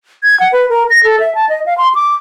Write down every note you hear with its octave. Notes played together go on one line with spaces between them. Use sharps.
G#6
F#5
B4
A#4
A#6
A4
E5
A5
D#5
F5
C6
D6